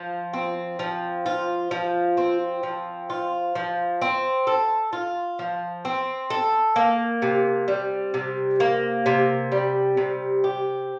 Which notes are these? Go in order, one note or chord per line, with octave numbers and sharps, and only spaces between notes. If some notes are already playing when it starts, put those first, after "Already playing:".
Already playing: F3 F4
C4
F3
F4
F3
C4
F3
F4
F3
C4
A4
F4
F3
C4
A4
A#3
C3
G3
C3
A#3
C3
G3
C3
G4